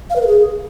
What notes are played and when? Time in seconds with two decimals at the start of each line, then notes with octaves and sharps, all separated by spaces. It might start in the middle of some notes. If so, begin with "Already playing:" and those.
0.10 F5
0.16 B4
0.21 A#4
0.27 G#4